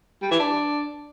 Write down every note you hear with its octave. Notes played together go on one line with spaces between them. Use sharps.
G3
E3
D4